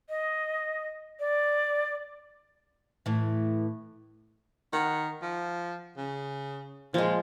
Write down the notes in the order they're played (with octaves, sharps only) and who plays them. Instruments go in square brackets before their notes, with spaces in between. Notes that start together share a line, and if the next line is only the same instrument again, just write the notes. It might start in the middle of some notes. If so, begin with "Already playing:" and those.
[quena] D#5
D5
[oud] A2 E3
[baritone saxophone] D#3 [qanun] F#5
[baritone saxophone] F3
C#3
[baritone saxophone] A#2 [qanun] F3 G#3